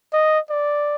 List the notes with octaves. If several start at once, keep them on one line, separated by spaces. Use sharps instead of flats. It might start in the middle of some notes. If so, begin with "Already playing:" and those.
D#5
D5